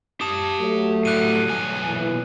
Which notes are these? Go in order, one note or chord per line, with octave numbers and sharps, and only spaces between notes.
G4 A5 D#6
F#3 A3
A2 G3 F#6 D#7
B1 G#5
A#2 E3